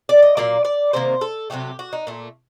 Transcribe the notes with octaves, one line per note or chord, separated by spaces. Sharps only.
D5
D#5
A#2 F#3 A#3 D5
D5
C3 D#3 A#3 C5
A4
C3 F#3 A3 G4
F#4
D#4
A#2 A3